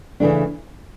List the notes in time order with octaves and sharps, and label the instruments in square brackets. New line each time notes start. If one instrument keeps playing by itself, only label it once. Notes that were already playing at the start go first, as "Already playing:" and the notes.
[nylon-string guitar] C#3 E3 A3 D4